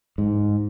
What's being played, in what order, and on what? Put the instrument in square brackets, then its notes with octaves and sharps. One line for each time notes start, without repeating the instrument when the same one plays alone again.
[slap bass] G#2